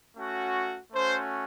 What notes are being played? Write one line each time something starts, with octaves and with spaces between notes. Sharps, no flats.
A3 C#4 F#4
A3 C#4 F#4 C5